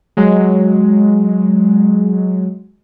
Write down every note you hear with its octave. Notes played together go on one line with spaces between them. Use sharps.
F#3 G#3